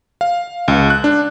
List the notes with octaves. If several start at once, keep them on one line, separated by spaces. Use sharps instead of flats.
F5
C#2
F#6
D4